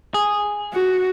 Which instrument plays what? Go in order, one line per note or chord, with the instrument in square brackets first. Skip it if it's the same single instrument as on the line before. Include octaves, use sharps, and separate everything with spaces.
[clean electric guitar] G#4
[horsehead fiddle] F#4